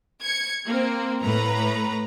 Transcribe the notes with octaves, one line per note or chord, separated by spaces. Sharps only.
G#6 C#7
A#3 C4
A2 B4 A#5